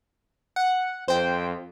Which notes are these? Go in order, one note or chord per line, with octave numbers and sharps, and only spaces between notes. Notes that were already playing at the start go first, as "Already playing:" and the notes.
F#5
F2 C5 G5